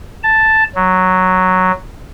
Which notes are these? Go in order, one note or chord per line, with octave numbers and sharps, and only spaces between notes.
A5
F#3